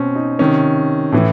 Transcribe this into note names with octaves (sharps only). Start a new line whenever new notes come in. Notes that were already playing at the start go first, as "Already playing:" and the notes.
Already playing: B2 C4 C#4
D#4
C3 D#3 C#4
A2 E3